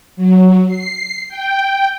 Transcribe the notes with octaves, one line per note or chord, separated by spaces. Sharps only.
F#3
C7
G5